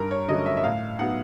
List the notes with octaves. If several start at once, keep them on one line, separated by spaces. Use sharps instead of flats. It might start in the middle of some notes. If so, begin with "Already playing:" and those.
Already playing: G2 A#4
C#5
D3 F#3 A3 C#4 D#5
E5
E5
A2 F5
F#3 B3 D#4 F#5